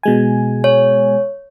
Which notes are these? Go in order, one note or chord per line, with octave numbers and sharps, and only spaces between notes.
B2 G#3 G#5
C#5